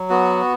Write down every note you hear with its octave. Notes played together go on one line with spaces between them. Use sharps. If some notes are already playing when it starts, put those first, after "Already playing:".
Already playing: F#3
B3 F#4